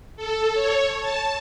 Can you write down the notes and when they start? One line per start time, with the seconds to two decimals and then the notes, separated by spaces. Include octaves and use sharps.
0.16 A4
0.54 C#5
1.00 A5